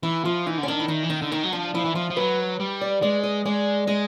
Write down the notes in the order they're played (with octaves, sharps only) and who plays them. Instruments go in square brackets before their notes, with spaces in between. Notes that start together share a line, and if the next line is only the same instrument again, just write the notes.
[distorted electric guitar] E3 [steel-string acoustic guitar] E4
[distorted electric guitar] F3 [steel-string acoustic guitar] F4
[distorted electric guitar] E3 [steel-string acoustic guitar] D#4
[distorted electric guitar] D3
[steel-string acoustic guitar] C#4
[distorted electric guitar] D#3 [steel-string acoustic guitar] D4
[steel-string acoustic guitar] E4
[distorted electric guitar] D#3 [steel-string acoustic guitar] D#4
[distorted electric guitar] E3
[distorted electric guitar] D#3 [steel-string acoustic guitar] D#4
[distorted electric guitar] D3
[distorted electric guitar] D#3 [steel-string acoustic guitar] D#4
[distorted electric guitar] F#3
[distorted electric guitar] F3 [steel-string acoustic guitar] D4
[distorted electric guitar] F3 [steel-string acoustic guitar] E4
[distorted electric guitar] E3
[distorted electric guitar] F3 [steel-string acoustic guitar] F4
[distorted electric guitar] F3
[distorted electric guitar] F#3 [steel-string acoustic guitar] B4
[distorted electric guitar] G3
[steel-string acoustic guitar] D5
[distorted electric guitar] G#3 [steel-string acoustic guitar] D5
[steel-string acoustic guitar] D#5
[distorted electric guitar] G#3 [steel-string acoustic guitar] D5
[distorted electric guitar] G#3 [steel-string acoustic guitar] D#5